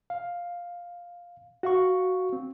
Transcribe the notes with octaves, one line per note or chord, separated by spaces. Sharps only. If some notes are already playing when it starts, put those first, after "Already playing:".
F5
F#4 F5 C#6
C4